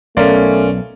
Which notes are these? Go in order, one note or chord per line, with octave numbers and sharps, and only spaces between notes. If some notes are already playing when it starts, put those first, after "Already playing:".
B1 A3 C#4 A#4 D5 F5 C6